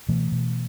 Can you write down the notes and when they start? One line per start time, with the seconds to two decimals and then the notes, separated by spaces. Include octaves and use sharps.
0.09 B2 E3 A3
0.32 B2